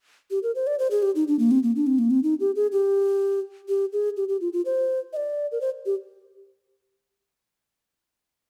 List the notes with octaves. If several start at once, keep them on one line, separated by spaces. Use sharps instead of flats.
G4
A#4
C5
D5
C5
G#4
G4
D#4
D4
A#3
C4
A#3
D4
C4
A#3
C4
D#4
G4
G#4
G4
G4
G#4
G4
G4
F4
F4
C5
D#5
D5
A#4
C5
G4